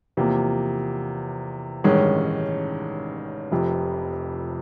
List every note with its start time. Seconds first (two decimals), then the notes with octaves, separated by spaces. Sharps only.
0.17 E2 C3 F3 A#3
1.84 A1 G2 D#3 G#3 C#4
3.51 F1 F2 C3